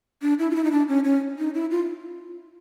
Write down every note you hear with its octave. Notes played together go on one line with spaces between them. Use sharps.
D4
E4
F4
E4
D#4
D4
C#4
C#4
D#4
E4
F4